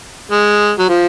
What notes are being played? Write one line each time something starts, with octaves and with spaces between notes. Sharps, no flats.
G#3
F#3
F3